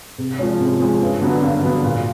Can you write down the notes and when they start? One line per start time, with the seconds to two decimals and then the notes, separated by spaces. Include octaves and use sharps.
0.18 C3
0.39 F3 G#3 C#4
0.60 C3
0.80 F3 G#3 C#4
1.01 G2
1.22 D3 F#3 B3
1.43 G2
1.63 D3 F#3 B3
1.84 A#2